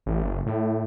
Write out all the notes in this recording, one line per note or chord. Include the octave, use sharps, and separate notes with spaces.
A1
F#1
A2